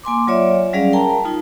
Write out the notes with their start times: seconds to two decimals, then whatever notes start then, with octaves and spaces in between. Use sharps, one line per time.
0.04 A#3 G#5 C6 D6
0.27 F#3 F4 C#5 D5 E5
0.73 F#3 G3 C#4 G#4 D5 F5
0.93 A#4 G5 A5 A#5
1.25 D#4 F4